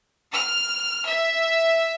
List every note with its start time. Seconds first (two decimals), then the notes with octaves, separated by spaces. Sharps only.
0.33 F6
1.08 E5